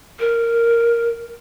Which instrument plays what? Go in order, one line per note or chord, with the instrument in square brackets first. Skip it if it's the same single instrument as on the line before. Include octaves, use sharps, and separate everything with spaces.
[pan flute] A#4